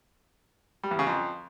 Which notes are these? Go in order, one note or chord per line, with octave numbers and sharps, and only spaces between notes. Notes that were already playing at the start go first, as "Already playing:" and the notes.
G3
E2
C#3
F2